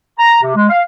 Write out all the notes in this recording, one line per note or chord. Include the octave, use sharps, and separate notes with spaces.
A#5
C3
G#3
F5